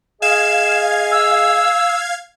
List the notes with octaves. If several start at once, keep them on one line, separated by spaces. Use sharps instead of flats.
G#4 D#5 F5 G#5 G#6 E7
E6